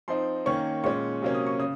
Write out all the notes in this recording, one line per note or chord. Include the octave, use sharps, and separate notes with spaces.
F3 C4 D#4 C6
D#3 A#3 C#4 C#6
A#2 G#3 C#4 C#6
C3 F#3 A#3 C#4
D#6
C#6
C#3 D#6